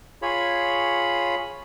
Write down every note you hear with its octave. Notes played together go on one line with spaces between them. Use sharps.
F4 G#4 C#5 B5